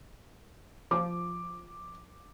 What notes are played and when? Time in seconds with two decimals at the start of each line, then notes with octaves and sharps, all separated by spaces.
0.91 F3 D6